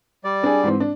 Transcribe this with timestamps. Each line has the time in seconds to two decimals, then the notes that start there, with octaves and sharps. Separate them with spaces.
0.24 G3 D5
0.43 D4 G#4
0.63 G#2 E3 C4
0.80 D4